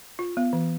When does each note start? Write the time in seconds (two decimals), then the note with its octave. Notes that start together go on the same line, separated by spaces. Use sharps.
0.19 F4
0.37 B3
0.53 E3